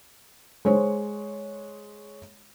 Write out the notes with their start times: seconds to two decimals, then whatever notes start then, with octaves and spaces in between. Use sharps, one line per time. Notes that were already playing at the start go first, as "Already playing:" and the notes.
0.65 G#3 C5 C#5